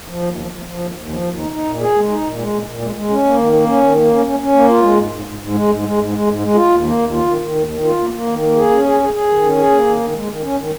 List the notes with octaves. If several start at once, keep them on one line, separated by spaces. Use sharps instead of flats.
F3
D#2
F3
F3
F3
D#2
D#2
F3
D#2
D#4
D#4
A#2
G#4
G#3
D#4
A#2
G#3
A#2
A#2
G#3
G#3
C#4
A#3
D#3
A#3
C#4
D#3
A#3
C#4
C#4
C#4
A#3
F4
G#3
G#2
G#2
G#2
G#2
G#3
G#2
G#3
G#2
G#3
G#2
G#3
F4
D#2
A#3
D#2
F4
D#3
D#3
D#2
D#3
F4
A#3
A#3
D#3
A#3
G#4
C#4
G#4
G#4
G#4
D#3
C#4
G#4
A#3
D#3
D#3
G#3
D#3
C#4
D#3